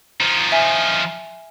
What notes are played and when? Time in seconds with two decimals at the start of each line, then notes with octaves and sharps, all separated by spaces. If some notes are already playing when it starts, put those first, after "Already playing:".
0.20 F3 D#4
0.52 E5 G#5